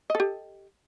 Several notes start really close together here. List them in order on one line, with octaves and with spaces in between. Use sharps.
D#5 A4 G4